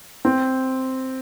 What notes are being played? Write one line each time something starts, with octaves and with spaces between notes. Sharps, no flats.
C4